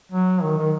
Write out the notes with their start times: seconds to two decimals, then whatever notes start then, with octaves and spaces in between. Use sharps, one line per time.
0.12 F#3
0.42 D#3
0.58 D#3